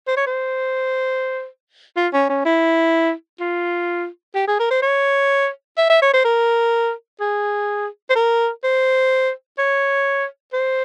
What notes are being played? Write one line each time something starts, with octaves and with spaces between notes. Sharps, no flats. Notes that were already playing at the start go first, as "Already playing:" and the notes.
C5
C#5
C5
F4
C#4
C#4
E4
F4
G4
G#4
A#4
C5
C#5
E5
E5
C#5
C5
A#4
G#4
C5
A#4
C5
C#5
C5